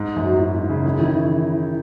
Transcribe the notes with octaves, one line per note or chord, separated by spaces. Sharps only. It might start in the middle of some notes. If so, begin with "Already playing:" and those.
Already playing: G#2
F#2
F#4
G#2 E4
G#2
C#3
D#3
C#3
D#3
E3